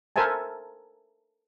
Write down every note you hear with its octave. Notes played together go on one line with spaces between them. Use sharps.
A4 A#4 C5 E5 G#5 A5